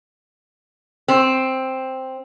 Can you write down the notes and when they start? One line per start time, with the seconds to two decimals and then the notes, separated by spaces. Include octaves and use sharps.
1.08 C4